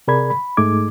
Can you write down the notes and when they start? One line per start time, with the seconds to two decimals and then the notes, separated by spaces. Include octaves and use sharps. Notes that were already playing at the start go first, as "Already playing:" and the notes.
0.08 C3 G#4 A#4 D5 B5 G#6
0.30 B5
0.57 G#2 A3 D#4 G#4 D6 G#6